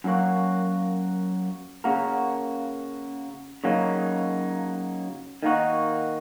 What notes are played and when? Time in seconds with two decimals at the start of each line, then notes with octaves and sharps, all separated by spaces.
0.04 F#2 F#3 A#3 F#4
1.84 C#3 A#3 F#4 A#4
3.64 C#3 F#3 A#3 D#4
5.43 D#3 A#3 D#4 F#4